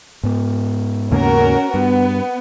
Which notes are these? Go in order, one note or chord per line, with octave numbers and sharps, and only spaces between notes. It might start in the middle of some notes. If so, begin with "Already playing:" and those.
G#2 B3
D#2 C#3 A#3 C#4 F#4 A#4
G2 B3